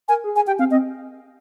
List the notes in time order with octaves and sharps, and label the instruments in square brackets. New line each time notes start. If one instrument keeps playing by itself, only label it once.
[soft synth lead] A#4 [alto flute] G#5
[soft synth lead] G#4
[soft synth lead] G#4 [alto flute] G#5
[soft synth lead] G4 [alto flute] G5
[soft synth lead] C4 [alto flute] F5
[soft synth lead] C4 [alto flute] D#5